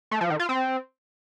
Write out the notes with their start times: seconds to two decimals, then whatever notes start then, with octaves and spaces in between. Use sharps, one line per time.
0.11 A3
0.21 F3
0.30 D#3
0.39 F4
0.49 C4